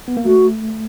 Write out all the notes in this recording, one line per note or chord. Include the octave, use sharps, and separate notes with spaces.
B3
A#3
A3 F#4